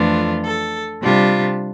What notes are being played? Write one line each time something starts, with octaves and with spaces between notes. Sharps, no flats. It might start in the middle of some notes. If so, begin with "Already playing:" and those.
Already playing: F2 E3 A3 D4 F4
A4
C3 G3 D4 F4